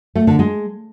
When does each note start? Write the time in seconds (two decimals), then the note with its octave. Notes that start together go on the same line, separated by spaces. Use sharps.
0.15 A3
0.27 D3
0.39 G#3